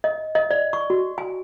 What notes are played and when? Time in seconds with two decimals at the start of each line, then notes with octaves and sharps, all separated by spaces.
0.04 D#5
0.35 D#5
0.51 D5
0.73 C#6
0.90 F#4
1.18 G#5